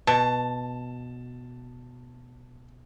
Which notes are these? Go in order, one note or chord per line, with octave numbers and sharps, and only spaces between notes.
B2 A5